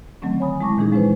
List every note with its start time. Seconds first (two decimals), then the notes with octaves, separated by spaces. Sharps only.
0.22 D3 D#3 F#3 A3 C4 C#4
0.40 C#5 G#5 B5 D#6
0.61 G#3 E4 A5 C#6 D6 A#6
0.77 A#2 D#3 E3 C#4 D#4 G#4
0.92 F3 G#3 C#4 E4 B4 C5